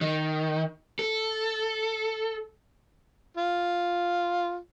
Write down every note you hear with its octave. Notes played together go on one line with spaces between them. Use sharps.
D#3
A4
F4